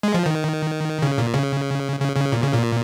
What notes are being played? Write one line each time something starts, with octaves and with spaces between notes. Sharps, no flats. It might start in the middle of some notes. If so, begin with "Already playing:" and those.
G#3
F3
D#3
C#3
A#2
C#3
C#3
C#3
A#2
C#3
A#2